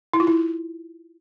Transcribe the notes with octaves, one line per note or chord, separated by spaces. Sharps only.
E4
F4
E4